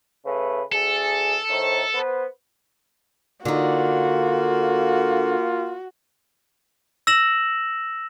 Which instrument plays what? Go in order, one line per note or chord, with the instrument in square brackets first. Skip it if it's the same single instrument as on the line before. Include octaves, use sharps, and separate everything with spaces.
[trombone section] C#3 A3 B4
[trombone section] D2 G#4 [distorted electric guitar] A4
[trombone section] A2 D#3 C5
B3 B4 C5
[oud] D3 D#4 [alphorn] A#3 [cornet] F4 [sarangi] F#4
[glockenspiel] E6 A#6 E7 F#7